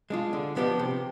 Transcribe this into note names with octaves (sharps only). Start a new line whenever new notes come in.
G#3 D4 F4
D3
F3 B3 D4 G4
C3